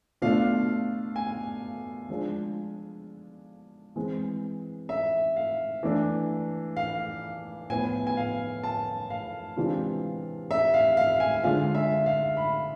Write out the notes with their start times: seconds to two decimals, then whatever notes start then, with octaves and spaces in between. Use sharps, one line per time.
0.22 B2 A3 D4 F4 F5
1.16 G#5
2.09 F3 G#3 D4 F4
3.96 E3 G#3 C4
4.89 E5
5.36 F5
5.83 E3 A3 D4
6.76 F5
7.70 A2 F3 B3 E4 G#5
8.07 G#5
8.17 F5
8.64 A5
9.10 F5
9.57 C3 E3 G#3 D4 F4
10.51 E5
10.74 F5
10.97 F5
11.20 G#5
11.43 D3 G#3 D4 F4 F5
11.75 E5
12.06 F5
12.37 B5